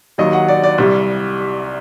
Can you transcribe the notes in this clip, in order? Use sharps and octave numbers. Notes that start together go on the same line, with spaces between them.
D#2 D#3 F#3 D#5
F#5
D5
D5
C2 C3 G3